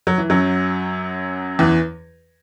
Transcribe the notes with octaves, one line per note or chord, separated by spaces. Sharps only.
F#3
E3
F#2 F#3
E2 E3